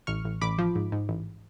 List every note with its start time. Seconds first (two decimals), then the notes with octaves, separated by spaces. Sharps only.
0.07 A1 C#6 F6
0.25 A1
0.41 A1 B5 D6
0.59 F3
0.75 G#2
0.92 G#2
1.09 A1